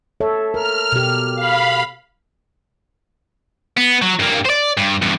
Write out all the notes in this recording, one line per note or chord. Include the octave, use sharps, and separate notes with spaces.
A4 C#5 E5
A#4 F6
B2 G4
F5 B5
B3
F#3
G2 A#3
C5 D5
G2
E2 G2